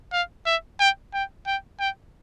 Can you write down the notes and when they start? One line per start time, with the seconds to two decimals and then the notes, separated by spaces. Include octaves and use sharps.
0.12 F5
0.46 E5
0.79 G5
1.13 G5
1.46 G5
1.79 G5